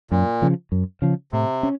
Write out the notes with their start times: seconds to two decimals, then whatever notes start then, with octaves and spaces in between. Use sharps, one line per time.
0.11 F#2 A#2
0.42 C#3 F3
0.72 F#2
1.02 C#3 F3
1.32 A2 C3
1.63 C#4